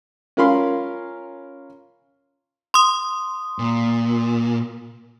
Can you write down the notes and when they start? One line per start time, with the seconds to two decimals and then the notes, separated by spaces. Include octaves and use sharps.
0.37 C#4 F4 A#4 F5 B5 C6
2.74 C6 D#6
3.59 A#2